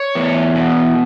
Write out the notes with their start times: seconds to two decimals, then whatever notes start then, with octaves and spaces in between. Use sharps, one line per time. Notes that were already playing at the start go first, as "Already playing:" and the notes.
Already playing: C#5
0.15 E2
0.55 B2